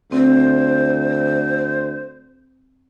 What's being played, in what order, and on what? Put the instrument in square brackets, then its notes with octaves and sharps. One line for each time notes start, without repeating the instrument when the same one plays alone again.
[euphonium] D2 [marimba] C4 [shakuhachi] C5